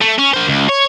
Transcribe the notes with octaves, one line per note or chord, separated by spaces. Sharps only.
A3
C#4
A#3 C5
C#2
C#5